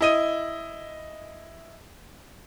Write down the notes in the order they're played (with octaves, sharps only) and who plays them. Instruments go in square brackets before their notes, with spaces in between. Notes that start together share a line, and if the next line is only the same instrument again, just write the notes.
[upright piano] E4 D#5 D#7